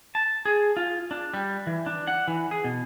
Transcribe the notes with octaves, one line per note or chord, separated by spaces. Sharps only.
A5
G#4
F4
D4
G3
E3
D4
F#5
E3
G#4
B2